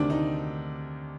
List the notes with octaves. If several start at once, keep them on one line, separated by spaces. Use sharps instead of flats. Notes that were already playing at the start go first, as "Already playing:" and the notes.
Already playing: D2 C3 D#3 D4
D#4